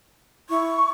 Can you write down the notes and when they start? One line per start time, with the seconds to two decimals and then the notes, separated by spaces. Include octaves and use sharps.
0.49 E4 C#6